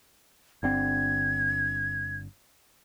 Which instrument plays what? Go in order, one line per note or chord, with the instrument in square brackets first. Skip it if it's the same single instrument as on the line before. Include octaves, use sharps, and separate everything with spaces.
[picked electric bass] G1 D3 C4 [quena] G#6